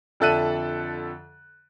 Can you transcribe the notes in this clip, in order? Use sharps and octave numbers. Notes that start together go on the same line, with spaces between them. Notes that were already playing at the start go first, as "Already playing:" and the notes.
F2 D3 A4 E5 F#6 D#7